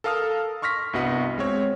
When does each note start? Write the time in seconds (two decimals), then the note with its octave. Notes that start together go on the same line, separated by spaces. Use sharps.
0.04 A4 A#4 F5 A5 D#6 F6
0.62 C6 C#6 F6 A#6 B6
0.93 C2 G2 B3 F#4 D#5 F#5
1.38 G#3 C4 C#5